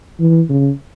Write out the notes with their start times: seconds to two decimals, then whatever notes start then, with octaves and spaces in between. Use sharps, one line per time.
0.20 E3
0.49 C#3